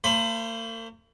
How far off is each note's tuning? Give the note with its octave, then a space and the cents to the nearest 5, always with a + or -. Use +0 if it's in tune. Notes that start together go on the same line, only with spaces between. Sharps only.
A#3 -45 C5 +0 B5 +25